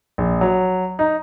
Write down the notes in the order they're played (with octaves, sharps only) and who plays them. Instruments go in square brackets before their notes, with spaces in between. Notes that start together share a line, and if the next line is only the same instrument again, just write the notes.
[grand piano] A#1
F#3
D#4